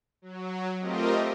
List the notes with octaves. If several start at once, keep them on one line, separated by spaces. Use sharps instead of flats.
F#3
A3 C4 F4 G4 A#4 D#5